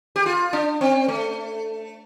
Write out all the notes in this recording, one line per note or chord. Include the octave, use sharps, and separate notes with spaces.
G4
F4
D4
C4
A3